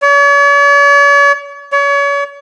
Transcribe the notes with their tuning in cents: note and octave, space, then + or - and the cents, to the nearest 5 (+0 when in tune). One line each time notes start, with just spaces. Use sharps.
C#5 +45
C#5 +35